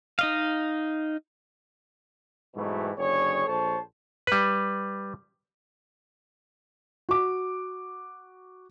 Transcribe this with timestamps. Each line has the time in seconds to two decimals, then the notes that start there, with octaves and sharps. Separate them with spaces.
0.19 D#4 D#5 F5
2.55 G#2 B2 E3 F#3 G3 A3
2.97 F#1 D3 G#4 C#5
3.46 A#1 A4 C5 C#5 A5
4.27 G3 B4
7.09 F#4 D6